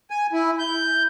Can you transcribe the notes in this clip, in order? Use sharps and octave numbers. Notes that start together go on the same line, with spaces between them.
G#5
E4
G6